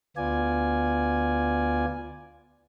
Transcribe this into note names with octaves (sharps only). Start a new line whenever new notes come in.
D2 B3 F4 D5 G#5